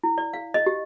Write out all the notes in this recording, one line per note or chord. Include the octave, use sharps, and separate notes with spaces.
E4
D5
F5
D#5
G4